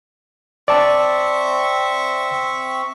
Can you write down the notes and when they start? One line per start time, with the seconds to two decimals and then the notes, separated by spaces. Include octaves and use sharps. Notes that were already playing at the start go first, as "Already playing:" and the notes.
0.68 C4 D5 E5 A5 C#6